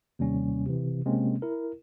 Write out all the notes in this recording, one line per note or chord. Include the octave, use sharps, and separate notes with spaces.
D#2 C3 G3 C#4
C3 E3
C3 G#3 A#3 C4 C#4
E4 A#4